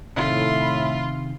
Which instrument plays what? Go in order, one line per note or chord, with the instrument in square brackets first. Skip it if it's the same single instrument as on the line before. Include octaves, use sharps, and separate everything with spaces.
[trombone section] A2 [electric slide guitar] C3 D#3 [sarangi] F4 [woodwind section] E5 B5